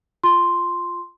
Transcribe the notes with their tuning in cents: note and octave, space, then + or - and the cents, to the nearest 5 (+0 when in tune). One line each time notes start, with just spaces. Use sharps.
F4 +0 C6 +0